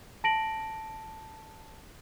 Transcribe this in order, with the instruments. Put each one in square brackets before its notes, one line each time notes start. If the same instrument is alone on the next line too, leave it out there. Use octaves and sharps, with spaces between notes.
[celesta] A5 A#6 D7 F#7